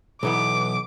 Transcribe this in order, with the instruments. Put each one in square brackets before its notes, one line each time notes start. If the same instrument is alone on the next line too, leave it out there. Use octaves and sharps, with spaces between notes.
[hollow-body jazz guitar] B1 E3 B3 [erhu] D6